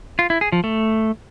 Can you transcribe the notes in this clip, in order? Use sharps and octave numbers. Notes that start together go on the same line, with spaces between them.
F4
E4
G#4
F3
A3